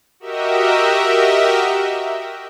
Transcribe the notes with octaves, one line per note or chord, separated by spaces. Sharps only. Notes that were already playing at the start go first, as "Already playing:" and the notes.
F#4 G4 A#4 D#5 E5